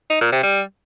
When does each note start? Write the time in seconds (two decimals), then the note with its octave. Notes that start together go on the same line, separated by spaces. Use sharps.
0.10 D#4
0.21 A#2
0.32 C3
0.43 G3